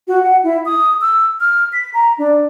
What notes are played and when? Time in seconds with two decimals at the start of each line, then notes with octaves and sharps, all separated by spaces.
0.08 F#4
0.23 F#5
0.44 E4
0.65 D#6
1.01 E6
1.40 F6
1.73 B6
1.94 A#5
2.18 D4